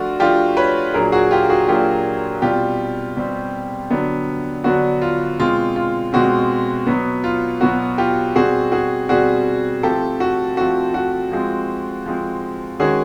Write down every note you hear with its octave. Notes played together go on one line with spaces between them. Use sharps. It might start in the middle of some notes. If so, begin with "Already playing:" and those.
Already playing: F3 A3 D4 F4 F#4
F3 A3 D4 F4 G4
B4 C#5
A#2 F#3 A#3 D4 G#4 A#4
F#4 G#4
F4 G4
F#4 G#4
A#2 F#3 A#3 D4 F4 G4
B2 G3 C4 F4 G4
B2 G3 C4
D3 F#3 B3 D4
D3 F#3 B3 D4 F#4
F4
B2 G#3 C4 F4
F4
B2 G#3 C4 F#4
B2 F#3 B3
F4
B2 F#3 B3 F#4
F4 G4
B2 G3 C4 F#4 G#4
F#4 G#4
B2 G3 C4 F#4 G#4
F3 A3 C4 G4 A4
F#4
F3 A3 C4 F#4
F#4
F3 G#3 C4
F3 G#3 C4
D#3 G#3 C#4 F#4 G#4